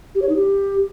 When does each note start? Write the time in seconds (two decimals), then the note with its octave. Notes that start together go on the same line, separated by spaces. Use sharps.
0.15 G4
0.22 C#5
0.29 D#4
0.36 G4